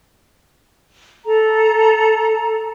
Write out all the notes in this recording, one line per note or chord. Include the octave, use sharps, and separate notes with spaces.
A4 A#5